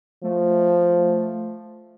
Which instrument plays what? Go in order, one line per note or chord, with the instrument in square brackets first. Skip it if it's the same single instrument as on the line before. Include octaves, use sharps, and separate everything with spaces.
[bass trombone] F3 [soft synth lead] A3